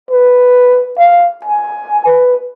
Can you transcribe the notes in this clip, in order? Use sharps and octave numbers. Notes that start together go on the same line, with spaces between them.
B4
F5
G#5
B4